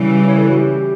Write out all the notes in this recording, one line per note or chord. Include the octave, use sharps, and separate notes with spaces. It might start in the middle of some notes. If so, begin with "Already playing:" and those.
Already playing: C#3 E3 G3
C#5
A4
F#4
G4